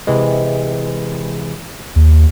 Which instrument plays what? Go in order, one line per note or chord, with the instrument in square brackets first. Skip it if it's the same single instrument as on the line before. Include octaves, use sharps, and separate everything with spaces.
[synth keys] C3 E3 G#3
[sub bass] D#2